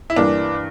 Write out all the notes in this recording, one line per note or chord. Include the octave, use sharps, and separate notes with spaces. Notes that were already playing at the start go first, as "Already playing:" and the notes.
E4
G2 E3 A#3 D4